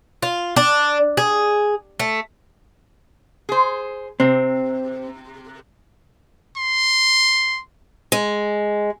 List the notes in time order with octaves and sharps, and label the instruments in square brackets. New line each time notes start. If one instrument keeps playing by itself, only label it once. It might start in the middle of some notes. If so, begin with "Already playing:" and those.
[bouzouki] F4
D4
G#4
A3
[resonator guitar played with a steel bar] G#4 C5
[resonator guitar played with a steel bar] C3 [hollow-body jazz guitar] C4
[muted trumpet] C6
[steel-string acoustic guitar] G#3